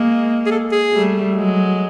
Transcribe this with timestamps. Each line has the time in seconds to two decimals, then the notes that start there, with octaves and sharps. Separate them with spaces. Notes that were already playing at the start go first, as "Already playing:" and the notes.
Already playing: G#3 A#3
0.46 G#4
0.51 A4
0.72 G#4
0.93 G3 A3
1.35 F#3 G#3